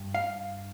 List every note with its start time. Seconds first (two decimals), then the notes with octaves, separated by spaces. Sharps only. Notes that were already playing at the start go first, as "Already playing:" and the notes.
Already playing: G2
0.15 F5